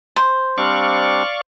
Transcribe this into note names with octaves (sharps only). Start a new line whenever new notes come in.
C5
G3 C4 D4 D5 F5 C#6